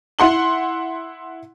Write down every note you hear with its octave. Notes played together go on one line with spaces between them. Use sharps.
E4 F#5 C6 F#7